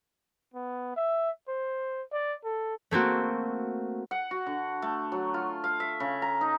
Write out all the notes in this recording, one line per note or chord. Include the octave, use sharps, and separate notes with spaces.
B3
E5
C5
D5
A4
A3 A#3 C4 F#4
F#5
F#4
D3
A3
F#3
F4
F5
E5
C#3
A#5
D#4